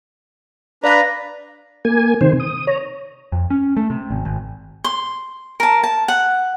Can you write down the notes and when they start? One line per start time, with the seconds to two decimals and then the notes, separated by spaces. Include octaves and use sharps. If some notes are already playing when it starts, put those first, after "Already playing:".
0.84 D4 B4 D5 F5 A#5 A#6
1.85 A#3 G#5
2.21 C3 D#3 C5
2.40 D#6
2.67 C#5 A#5
3.32 F2
3.50 C#4
3.77 A3
3.90 C3
4.11 G#1
4.25 G#1
4.84 C6
5.60 A#4 A5
5.83 A5
6.08 F#5